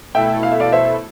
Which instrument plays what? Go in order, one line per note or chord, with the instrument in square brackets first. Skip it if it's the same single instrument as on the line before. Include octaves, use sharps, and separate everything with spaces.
[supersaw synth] B2 A3 E4 A4 [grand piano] E5 G5
[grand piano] F5
E5
D5 F5
C5 E5